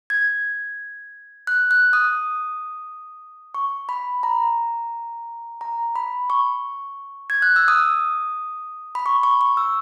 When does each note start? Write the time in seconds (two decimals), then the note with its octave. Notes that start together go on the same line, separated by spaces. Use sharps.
0.10 G#6
1.47 F#6
1.71 F#6
1.93 D#6
3.54 C#6
3.89 B5
4.23 A#5
5.61 A#5
5.96 B5
6.30 C#6
7.30 G#6
7.42 F#6
7.56 E6
7.68 D#6
8.95 B5
9.06 C#6
9.23 C#6
9.41 C#6
9.57 E6